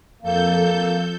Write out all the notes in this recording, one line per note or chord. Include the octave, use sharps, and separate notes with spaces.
F2 A#3 A4 G6